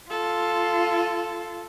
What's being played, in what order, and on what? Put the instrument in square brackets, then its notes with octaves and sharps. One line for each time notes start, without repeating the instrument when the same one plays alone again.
[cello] F4 [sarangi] A4